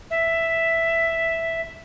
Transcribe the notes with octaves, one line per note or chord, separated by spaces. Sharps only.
E5